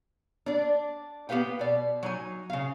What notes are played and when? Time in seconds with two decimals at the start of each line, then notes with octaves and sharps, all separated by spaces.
0.46 D4 D5
1.29 B3 G4 B4 F5 G5
1.59 B2 D5
2.03 F#3 D#4 G#5
2.50 C#3 F5